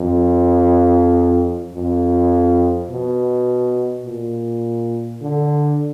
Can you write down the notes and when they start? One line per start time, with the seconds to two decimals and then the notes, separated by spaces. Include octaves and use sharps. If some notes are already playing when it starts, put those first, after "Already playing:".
Already playing: F2
1.74 F2
2.89 B2
4.05 A#2
5.21 D3